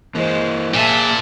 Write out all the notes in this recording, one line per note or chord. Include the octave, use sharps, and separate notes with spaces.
E3 G#3 A#3 C5
A#2 A#3 G#4 E5 A5